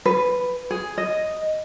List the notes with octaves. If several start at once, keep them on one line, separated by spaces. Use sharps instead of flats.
B4
G#4
D#5